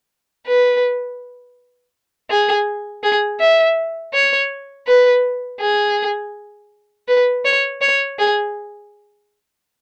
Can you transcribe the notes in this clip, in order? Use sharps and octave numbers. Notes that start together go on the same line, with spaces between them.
B4
G#4
G#4
E5
C#5
B4
G#4
B4
C#5
C#5
G#4